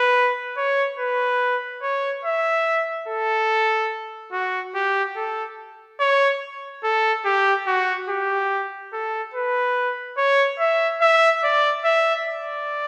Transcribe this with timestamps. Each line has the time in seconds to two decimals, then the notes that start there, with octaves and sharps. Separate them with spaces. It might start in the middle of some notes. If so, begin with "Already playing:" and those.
Already playing: B4
0.58 C#5
0.99 B4
1.83 C#5
2.25 E5
3.08 A4
4.33 F#4
4.75 G4
5.17 A4
6.00 C#5
6.84 A4
7.26 G4
7.67 F#4
8.09 G4
8.93 A4
9.34 B4
10.18 C#5
10.60 E5
11.01 E5
11.44 D5
11.85 E5
12.27 D5